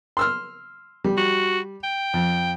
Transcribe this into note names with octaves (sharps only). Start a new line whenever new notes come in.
C6 E6 F6
G3
F#4
G5
F2